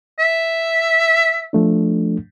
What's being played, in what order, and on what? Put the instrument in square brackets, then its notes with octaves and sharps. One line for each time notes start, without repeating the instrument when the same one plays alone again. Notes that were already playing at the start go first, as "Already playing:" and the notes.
[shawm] E5
[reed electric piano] F3 A3 D4